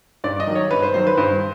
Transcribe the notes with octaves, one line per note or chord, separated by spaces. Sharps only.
G2 D5
D#5
D#3 F#3
C#5
G2 B4
C5
D#3 F#3 C5
B4
G2 C5